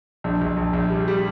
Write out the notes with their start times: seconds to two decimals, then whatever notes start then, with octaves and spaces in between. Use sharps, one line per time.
0.24 A#1
0.41 A#1
0.57 A#1
0.73 A#1
0.90 G3
1.08 G3